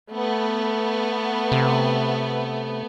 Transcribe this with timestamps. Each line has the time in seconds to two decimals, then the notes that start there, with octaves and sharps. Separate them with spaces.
0.13 A3 B3
1.52 C3